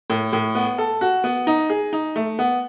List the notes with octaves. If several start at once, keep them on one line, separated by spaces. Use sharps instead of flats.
A2
A2
B3
A4
F#4
B3
D#4
G#4
D#4
A3
B3